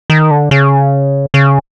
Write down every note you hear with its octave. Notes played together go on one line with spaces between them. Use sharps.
D#3
D3
C#3
C#3